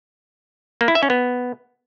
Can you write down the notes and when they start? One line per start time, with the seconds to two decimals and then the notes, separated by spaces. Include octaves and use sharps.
0.81 A#3
0.88 E4
0.95 E5
1.03 C#4
1.10 B3